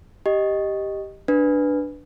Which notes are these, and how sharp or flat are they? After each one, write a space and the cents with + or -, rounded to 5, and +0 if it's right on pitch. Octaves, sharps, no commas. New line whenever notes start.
G4 +0 D#5 +0
D4 +5 B4 +0